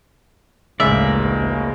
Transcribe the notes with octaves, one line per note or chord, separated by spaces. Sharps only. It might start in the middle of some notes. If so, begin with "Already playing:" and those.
A1 D2 A2 C#3 G#3 A#3 D5 E5